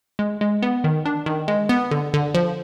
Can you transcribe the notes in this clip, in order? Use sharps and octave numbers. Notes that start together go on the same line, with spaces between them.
G#3
G#3
B3
D#3
D4
D#3
G#3
B3
D3
D3
F3